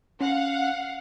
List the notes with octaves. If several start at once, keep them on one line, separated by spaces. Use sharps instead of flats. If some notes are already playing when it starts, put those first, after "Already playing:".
C#4 F5 F#5